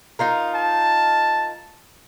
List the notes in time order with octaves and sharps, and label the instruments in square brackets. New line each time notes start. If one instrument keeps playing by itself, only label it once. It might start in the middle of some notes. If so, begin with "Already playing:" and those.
[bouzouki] D#4 F4 A#4
[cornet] A5